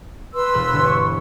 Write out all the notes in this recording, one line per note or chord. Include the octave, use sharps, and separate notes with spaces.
B4 C6 E6
E1 A#4 F#6
G1 A4 C#5
C#6